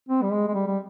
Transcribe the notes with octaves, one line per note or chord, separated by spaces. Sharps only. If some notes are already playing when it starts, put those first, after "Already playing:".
C4
G3
G#3
G#3
G3
G3